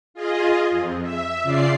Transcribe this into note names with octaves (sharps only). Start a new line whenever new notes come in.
F4 G#4 D#5
F2
E5
C#3 F4 D5 C7